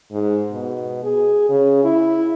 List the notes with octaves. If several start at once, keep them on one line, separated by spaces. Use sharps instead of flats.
G#2
B2
G#4
C#3
E4